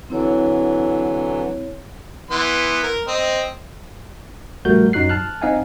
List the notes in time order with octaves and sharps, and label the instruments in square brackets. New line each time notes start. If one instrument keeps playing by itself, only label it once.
[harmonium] D3 E3 F#3 [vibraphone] C4 E4 C#5
[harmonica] E3 B3 C6
A#4
C4 D#5
[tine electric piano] A#1 G3 A3 F#4 A#4 G6
F#2 F#3 D#4 F#4 F#6 C7
A5 F6 F#6
C4 D#4 D#5 F5 F#5 G#5